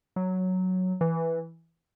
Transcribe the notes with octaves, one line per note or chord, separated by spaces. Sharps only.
F#3
E3